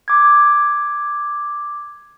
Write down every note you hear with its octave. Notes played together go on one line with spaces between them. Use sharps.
D6 G#6